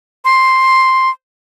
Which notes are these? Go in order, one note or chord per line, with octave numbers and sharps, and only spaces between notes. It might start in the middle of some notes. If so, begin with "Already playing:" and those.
C6